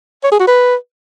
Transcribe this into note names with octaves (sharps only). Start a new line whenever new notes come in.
C#5
G#4
F#4
B4